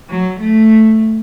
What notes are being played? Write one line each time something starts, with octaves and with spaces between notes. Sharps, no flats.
F#3
A3